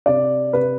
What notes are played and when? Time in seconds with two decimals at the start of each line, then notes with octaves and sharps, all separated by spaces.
0.06 C3 D5
0.53 C3 B4